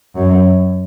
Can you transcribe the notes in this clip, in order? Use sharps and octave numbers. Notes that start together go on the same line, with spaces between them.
F#2